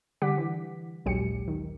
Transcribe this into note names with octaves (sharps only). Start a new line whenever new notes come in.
D3 G3 G4 F#5 D6 B6
E3
A#1 D#2 F#3 G#3 G4 C#7
D#3